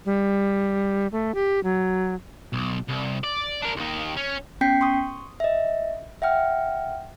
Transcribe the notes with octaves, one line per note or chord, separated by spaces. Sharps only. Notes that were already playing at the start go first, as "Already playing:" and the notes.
G3
A3
G4
F#3
B1
C2
D5
D4 A#4
D#2 D#3
C#4
B3 C#4 G5 G6 B6 C7
C6 C#6 D#6
D#5 E5
E5 F#5 G5 F6